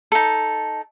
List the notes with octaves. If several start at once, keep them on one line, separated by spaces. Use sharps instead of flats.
D#4 A4